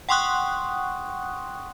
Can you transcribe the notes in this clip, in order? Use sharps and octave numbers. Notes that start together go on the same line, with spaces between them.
F#5 G5 C6 C#6 D#6 F#6